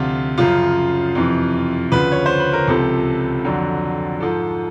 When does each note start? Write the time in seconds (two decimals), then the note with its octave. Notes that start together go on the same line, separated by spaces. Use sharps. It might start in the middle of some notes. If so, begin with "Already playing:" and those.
Already playing: D2 C3 F3 F4
0.38 F#2 C#3 F3 F4
1.15 F2 C3 E3
1.92 D2 C#3 F3 B4
2.12 C#5
2.26 C5
2.40 B4
2.53 A#4
2.67 C#2 C3 F3 A4
3.44 F2 D3 F#3
4.20 G#2 F3 A4